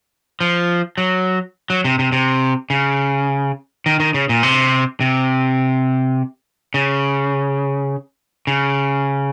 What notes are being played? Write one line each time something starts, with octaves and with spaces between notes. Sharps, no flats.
F3
F#3
F#3
C3
C3
C3
C#3
D#3
D#3
C#3
A#2
C3
C3
C#3
C#3